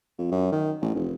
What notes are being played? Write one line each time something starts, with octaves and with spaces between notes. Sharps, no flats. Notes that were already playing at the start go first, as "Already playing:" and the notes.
F2
F#2
D#3
A1
F1